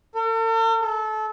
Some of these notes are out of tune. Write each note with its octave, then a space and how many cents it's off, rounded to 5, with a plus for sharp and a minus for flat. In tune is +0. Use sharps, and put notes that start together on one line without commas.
A4 +45
A4 -25